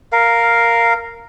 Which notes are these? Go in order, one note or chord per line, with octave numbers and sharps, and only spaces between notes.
A#4 F5